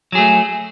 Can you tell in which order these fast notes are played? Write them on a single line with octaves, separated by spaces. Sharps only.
F#3 G#4 A3